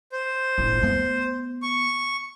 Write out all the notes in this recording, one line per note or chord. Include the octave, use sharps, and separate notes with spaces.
C5
G1 A2
A3 B3
C#6